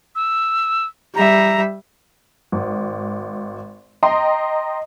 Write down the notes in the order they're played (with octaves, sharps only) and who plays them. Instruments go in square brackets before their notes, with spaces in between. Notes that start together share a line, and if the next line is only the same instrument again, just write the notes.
[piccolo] E6
[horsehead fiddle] G3 E5 [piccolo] A#5
[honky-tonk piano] G#1
D#5 G5 A#5 C6